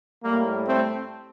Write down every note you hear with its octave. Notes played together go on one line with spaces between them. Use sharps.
A2 G3 A#3
A3 C4